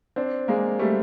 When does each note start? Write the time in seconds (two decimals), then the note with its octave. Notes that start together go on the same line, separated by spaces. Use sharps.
0.16 C4 D4
0.48 G#3 A#3
0.79 G3 A3